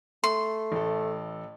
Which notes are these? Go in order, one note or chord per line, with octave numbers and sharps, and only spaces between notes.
A3 C6
A1 A4